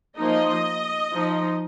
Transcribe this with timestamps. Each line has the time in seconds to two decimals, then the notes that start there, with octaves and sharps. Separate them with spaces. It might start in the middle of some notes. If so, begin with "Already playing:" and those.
0.18 F3 A#3 D#4 D#5
1.12 F3 D#4